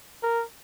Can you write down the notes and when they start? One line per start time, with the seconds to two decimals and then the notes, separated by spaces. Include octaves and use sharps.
0.23 A#4